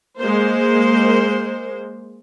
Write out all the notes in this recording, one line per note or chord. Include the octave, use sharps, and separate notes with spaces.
G#3 A#3 C5